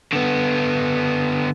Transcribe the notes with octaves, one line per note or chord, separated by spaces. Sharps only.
D3 B3